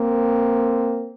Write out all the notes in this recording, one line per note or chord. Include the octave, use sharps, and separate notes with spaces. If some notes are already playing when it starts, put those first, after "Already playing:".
Already playing: A#3 C4